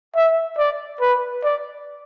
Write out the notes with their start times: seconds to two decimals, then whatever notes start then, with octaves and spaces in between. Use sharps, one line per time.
0.15 E5
0.58 D5
1.00 B4
1.43 D5